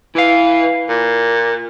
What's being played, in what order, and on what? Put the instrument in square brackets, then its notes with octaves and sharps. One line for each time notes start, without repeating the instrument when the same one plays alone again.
[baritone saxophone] E3 [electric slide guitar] E4 F5
[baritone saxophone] A#2